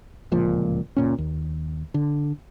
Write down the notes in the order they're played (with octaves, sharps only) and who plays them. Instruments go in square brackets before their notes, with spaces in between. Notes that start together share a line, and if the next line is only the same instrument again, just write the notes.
[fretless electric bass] D1 C#2 A#2 F3
F#1 A#2 C#4
D#2
D3